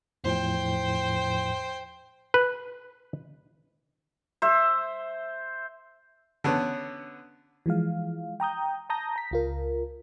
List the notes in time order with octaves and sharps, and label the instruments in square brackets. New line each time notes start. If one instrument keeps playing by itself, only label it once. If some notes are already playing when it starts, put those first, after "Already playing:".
[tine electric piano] E2 A2 F3 [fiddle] C5 G5
[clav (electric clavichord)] B4
[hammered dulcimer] C5 E5
[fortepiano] D3 B3 C#4
[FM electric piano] E3 F3 G#3 F5
G5 A#5 D#6 G6
A5 A#5 D#6 G6 A#6
A#5 B6
C#2 F4 A#4